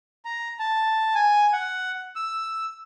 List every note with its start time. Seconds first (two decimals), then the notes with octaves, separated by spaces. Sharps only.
0.25 A#5
0.59 A5
1.15 G#5
1.53 F#5
2.16 E6